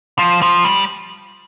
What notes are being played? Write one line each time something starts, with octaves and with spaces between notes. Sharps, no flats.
F3
F3
G3